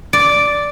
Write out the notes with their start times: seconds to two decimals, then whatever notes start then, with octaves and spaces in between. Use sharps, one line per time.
0.13 D5